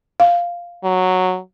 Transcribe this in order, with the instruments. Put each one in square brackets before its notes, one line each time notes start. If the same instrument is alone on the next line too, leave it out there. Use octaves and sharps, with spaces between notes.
[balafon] F5
[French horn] F#3